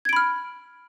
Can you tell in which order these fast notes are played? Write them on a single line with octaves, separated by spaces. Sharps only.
G#6 D7 B5 F6